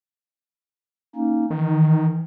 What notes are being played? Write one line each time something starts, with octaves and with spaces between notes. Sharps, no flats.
A#3 C#4 D#4
D#3 E3